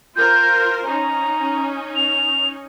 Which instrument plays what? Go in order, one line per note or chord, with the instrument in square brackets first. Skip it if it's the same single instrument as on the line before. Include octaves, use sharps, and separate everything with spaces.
[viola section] F4 A#4 C5 [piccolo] G6
[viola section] C#4 D#4 [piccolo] A#5
[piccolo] F7